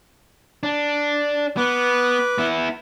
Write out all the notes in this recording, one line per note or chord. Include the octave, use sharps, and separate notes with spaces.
D4
B3 B4 D6
B3 E4